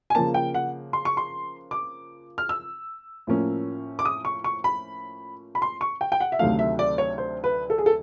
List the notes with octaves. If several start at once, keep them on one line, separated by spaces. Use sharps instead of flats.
G#5
C#3 F3 A#3 A5
G5
F#5
C6
C#6
C6
D6
F6
E6
A2 F3 A#3 C#4
D6
D#6
C#6
C#6
B5
B5
C6
C#6
G5
G5
F#5
E5
D2 C3 D#3 F#3 A3 F5
E5
D5
C#5
C5
B4
A4
G#4
A4